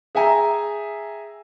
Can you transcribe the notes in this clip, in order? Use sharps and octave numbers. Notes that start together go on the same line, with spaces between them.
G#4 E5 G5 G#5 A#5